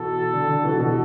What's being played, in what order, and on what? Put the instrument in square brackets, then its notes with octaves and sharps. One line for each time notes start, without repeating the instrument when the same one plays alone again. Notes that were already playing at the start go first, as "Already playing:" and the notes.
Already playing: [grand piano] B2 E3 [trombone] A4
[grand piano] D3
D3
B2 E3
B2 E3